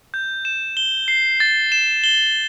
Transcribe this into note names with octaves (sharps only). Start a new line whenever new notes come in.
G6
E7
G7
C7
A6
E7
G7